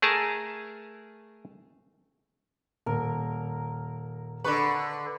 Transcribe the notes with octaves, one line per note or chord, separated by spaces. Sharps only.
A3 G#4 A#4 A5 A#5
D#1 A#4
D3 B4 D5 C#6